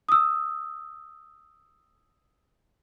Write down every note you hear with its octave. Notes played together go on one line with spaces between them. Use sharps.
D#6 E6